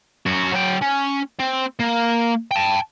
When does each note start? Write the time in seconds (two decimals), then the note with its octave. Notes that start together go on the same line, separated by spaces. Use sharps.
0.26 F#2 F#4
0.54 F#3 G5
0.82 C#4
1.39 C4
1.79 A#3
2.51 G5 A5